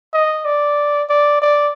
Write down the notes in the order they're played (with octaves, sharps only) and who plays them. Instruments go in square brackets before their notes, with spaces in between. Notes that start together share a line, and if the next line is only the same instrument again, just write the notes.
[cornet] D#5
D5
D5
D5